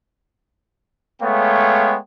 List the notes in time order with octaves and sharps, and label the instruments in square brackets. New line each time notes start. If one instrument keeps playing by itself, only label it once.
[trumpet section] G#3 A3 B3 C#5 F5 G5